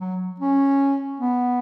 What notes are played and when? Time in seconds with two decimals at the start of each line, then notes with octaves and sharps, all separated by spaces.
0.01 F#3
0.40 C#4
1.20 B3